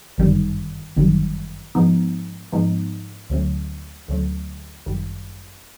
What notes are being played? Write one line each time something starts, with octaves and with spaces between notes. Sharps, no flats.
G1 F#2 D#3 G3
G1 F#2 D#3 G3
G#2 F3 G#3 B3 D#4
G#2 F3 G#3 B3 D#4
D2 D3 F#3 A3 C#4
D2 D3 F#3 A3 C#4
G1 F#2 D#3 G3